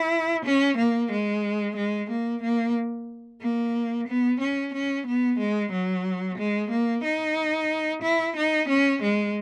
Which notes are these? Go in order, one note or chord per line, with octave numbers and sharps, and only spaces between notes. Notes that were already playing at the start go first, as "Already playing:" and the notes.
Already playing: E4
C#4
A#3
G#3
G#3
A#3
A#3
A#3
B3
C#4
C#4
B3
G#3
F#3
G#3
A#3
D#4
E4
D#4
C#4
G#3